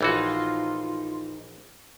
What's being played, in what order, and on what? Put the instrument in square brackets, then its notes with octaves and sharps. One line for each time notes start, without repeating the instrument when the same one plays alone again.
[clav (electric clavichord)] A#1 E3 F#4 [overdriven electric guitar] D#4 [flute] F4